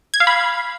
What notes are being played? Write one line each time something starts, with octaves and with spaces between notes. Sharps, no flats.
G#6
F5
B5